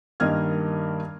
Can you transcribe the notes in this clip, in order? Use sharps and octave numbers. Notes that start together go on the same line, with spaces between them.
G2 D#3 A#3 D#5 F6 G#6